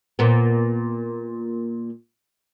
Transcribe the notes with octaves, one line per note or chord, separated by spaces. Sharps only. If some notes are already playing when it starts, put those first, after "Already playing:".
A#2 B3